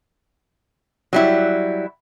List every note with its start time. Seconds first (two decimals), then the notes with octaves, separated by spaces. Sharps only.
1.13 F#3 G3 E4